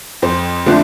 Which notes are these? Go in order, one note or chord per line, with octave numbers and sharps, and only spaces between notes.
F2 C5
D3 F3 A3 D4